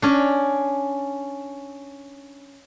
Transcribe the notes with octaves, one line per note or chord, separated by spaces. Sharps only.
C#4 D4